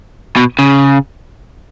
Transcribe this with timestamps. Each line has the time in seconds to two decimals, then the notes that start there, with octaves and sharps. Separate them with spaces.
0.37 B2
0.59 C#3